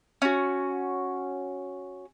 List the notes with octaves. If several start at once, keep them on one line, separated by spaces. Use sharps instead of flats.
C#4 F#4